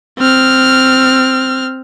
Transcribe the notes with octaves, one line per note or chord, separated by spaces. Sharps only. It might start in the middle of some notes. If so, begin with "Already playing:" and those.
C4 F6